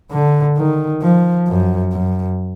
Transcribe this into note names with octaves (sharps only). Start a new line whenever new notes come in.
D3
D#3
F3
F#2
F#2